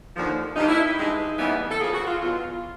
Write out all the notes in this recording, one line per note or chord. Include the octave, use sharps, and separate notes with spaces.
D#2 D3 F3
G2 D#3 G3 A#3 D#4
E4
D#4
G2 E3 G#3
D#2 C#3 E3 G3 B3
A4
C#3 F3 A#3 G#4
F#4
F4
E2 B2 F#3 F4